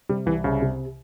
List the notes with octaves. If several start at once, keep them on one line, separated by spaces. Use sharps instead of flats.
C3 G3
C2 E3
C2 C#3
C3